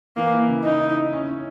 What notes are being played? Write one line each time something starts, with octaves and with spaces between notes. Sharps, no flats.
E3 A#3
E4
C#3
D#4 E4
E4
E4
C#4
C#4